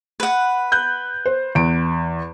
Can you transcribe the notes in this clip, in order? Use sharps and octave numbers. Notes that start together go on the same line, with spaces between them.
B4 F#5
F#6 G6
C5
E2 D7